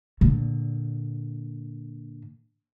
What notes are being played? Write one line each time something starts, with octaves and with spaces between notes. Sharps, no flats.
A#2 D3